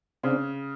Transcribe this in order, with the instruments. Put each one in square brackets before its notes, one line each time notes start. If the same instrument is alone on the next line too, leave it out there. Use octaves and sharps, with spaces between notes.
[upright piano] C#3 [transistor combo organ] C4 D4